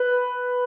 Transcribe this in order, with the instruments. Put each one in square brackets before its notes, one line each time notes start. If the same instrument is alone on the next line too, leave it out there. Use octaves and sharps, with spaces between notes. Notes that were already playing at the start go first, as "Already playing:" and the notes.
Already playing: [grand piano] B4